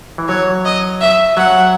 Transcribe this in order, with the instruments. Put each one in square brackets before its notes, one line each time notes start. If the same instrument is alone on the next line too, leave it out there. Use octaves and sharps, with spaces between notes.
[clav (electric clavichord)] E3
[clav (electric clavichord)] F#3 [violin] C#5
[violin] D#5
E5
[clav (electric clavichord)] F#3 [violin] F#5